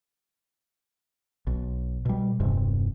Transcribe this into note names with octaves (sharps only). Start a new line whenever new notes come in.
B1
B2 G3
E1 G2 C3